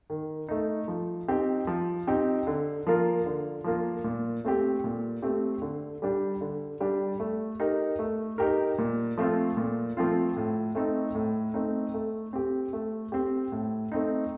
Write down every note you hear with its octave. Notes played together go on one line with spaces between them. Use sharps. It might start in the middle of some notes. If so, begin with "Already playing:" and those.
D#3
A3 D#4
F3
C4 D#4 G4
F3
C4 D#4 G4
D3
F3 A#3 F4 A#4
D3
F3 A#3 F4 A#4
A#2
A3 C4 G4
A#2
A3 C4 G4
D3
G3 D4 G4
D3
G3 D4 G4
A3
D#4 G4 A#4
A3
D#4 G4 A#4
A#2
F3 A3 C4 F4
A#2
F3 A3 C4 F4
A2
A3 C4 D#4
A2
A3 C4 D#4
A3
C4 G4
A3
C4 G4
A2
A3 C4 D#4